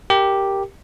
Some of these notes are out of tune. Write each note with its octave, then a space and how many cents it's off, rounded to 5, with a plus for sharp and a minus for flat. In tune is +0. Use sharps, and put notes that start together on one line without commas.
G4 +0 A#4 +0